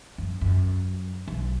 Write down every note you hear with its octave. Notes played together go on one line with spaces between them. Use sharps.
F#2
F#2
B1